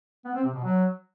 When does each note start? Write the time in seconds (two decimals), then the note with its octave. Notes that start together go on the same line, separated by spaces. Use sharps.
0.25 B3
0.34 C4
0.44 C3
0.54 B2
0.64 F#3